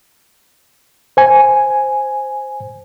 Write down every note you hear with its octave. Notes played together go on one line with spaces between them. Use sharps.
C5 G#5